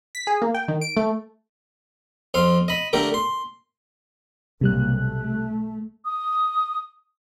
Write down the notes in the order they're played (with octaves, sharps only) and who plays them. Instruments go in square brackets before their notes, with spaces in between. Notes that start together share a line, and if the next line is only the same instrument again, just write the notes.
[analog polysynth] B6
G#4
A#3
G5
D#3
D7
A3
[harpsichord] F2 F5 C6
D#5 B5
D3 A3 G4 A#4
C6
[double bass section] B1 G#2 A#3 [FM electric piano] C3 G3 F#6
[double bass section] A3
[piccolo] D#6